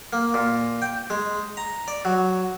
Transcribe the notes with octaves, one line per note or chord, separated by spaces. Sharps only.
A#3
A#2
G5
G#3
A#5
D5
F#3